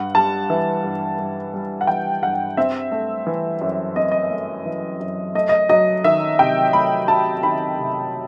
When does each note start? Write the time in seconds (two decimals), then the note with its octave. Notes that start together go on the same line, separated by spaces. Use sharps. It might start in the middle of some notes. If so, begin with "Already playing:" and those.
Already playing: G2 F#5
0.15 G3 A5
0.50 E3
0.84 G2
1.19 G2
1.54 G3
1.81 F#5
1.87 E3 G5
2.22 G2 F#5
2.57 C4 E5
2.92 A3
3.27 E3
3.61 F#2
3.96 C4 D#5
4.12 D#5
4.30 A3
4.65 E3
5.00 F#2
5.35 A3 D#5
5.49 D#5
5.69 F#3 D#5
6.04 D#3 E5
6.39 C3 G5
6.73 A3 B5
7.08 F#3 A5
7.43 D#3 B5
7.78 C3